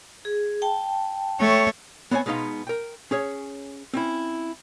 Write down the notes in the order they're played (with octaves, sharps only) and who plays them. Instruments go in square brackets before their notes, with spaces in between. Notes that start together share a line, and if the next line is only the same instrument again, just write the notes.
[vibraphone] G#4
G5 A5
[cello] A3 C#5
[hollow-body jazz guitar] B3 C4 C#5 D#5 G#5
B2 G#3 B3 D#4 F5 C6
A#4 G5
C#4 G#4 C#5
C4 C#4 E4